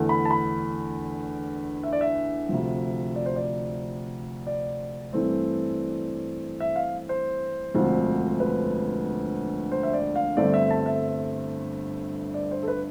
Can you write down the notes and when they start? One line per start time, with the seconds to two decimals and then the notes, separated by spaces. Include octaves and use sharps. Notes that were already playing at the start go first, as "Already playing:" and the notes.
Already playing: E2 D3 A3
0.09 B5
0.25 A5
0.31 B5
1.83 E5
1.93 D5
2.01 E5
2.49 D2 C3 F3
3.16 D5
3.26 C5
3.36 D5
4.47 D5
5.13 G2 E3 A3 C4
6.60 E5
6.76 F5
7.09 C5
7.74 E1 D2 D3 F3 C4
8.40 B4
9.72 C5
9.83 E5
9.93 D5
10.15 F5
10.37 G1 G2 D3 A3 C4 D5
10.54 E5
10.70 A5
10.86 E5
12.34 D5
12.51 C5
12.62 A4
12.68 B4